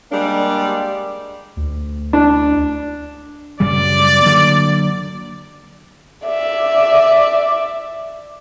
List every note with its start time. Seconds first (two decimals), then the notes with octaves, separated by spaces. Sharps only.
0.10 G3 G#3 A#3 D4
1.57 D2
2.13 D4
3.60 F#2 C#3 G3 D5
4.22 D3 F#3 A#3
6.26 D5 E5